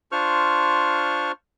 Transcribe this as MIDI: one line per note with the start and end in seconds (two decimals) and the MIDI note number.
0.12 1.32 62
0.12 1.32 65
0.12 1.32 72
0.12 1.32 85
0.12 1.32 89